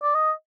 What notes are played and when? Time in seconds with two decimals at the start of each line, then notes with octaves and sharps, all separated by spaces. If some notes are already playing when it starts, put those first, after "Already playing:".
0.03 D5
0.15 D#5